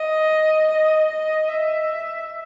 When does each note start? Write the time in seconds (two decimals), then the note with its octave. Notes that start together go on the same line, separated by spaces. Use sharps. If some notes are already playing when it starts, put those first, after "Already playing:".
Already playing: D#5
0.68 D#5
1.08 D#5
1.49 E5